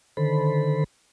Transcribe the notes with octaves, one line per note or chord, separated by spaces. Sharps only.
D3 D#3 A4 C5 B5